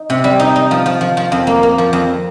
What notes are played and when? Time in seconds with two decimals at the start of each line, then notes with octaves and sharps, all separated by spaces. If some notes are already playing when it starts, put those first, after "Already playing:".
Already playing: D#4
0.10 C3
0.24 G3
0.40 D#4
0.56 D#4
0.71 F3
0.86 F3
1.01 F3
1.17 F3
1.32 F2
1.47 A#3
1.63 A#3
1.78 F3
1.93 F2